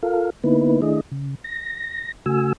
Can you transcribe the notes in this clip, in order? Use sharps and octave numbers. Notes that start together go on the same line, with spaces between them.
F4 A4 A#4 F5
D3 A#3 B3 D#4 E4 B4
D#3 A3 D4 E4 G#4 D#5
C#3
A#6
C#3 A3 F#4 G#5 E6